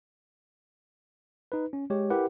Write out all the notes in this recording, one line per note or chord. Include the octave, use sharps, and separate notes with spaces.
D#4 B4
C#4
G#3 G4 C#5
E4 G4 A#4 B4 F#5